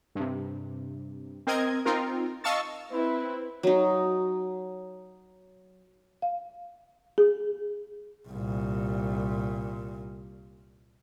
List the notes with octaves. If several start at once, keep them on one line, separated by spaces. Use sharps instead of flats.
G2 C3
C4 A#4 D#5 G#6
C4 D#4 F4 A#4
D#5 F5 A5 C#6 E6 A6
C4 E4 B4
F#3 D#4
F5
G#4
C2 A#2